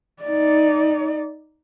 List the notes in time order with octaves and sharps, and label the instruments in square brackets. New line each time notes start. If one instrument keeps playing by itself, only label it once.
[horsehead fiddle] D#4 D5